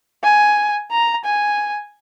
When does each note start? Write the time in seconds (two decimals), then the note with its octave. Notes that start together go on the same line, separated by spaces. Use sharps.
0.23 G#5
0.91 A#5
1.24 G#5